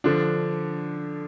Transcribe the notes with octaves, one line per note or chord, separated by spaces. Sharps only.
D3 F3 D4